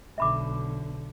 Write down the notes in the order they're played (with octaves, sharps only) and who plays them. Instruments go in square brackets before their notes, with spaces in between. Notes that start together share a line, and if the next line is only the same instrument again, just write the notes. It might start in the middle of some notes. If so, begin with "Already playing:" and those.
[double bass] B1 D3 [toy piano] E5 B5 D6